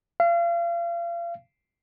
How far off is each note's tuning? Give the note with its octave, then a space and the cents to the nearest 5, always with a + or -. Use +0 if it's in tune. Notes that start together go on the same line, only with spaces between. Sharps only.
F5 -35